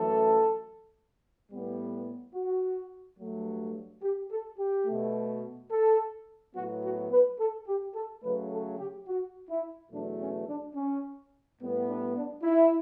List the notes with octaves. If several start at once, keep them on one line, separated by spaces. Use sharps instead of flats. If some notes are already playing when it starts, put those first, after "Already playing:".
Already playing: F#2 E3 A3 A4
A2 G3 B3
F#4
G2 F#3 A3
G4
A4
G4
B2 A3
A4
A2 F#3 B3 F#4
F#4
B4
A4
G4
A4
C#3 F#3 A3 B4
A4
G4
F#4
E4
E2 B2 F#3 A3 D4
C#4
D4
C#4
A2 G3 B3
D4
D4
E4